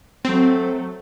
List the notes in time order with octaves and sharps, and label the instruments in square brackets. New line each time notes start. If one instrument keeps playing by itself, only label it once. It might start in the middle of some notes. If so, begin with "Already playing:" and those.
[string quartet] F#3 A3 [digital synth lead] C4